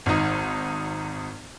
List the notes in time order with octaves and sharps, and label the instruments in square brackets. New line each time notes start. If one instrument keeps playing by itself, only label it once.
[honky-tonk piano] G#1 D#4